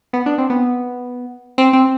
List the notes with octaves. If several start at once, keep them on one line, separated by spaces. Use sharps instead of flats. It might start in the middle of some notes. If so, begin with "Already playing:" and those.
B3
D4
C4
B3
C4
C4